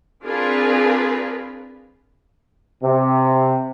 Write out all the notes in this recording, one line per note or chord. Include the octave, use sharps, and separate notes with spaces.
C4 D4 F4 G#4 A#4 B4
C3